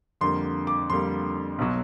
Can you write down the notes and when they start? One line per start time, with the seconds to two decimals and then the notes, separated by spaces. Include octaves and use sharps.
0.21 F2 D3 G3 A#3 C6
0.67 D6
0.90 F2 D3 G3 A#3 C6
1.58 B1 B2 F#3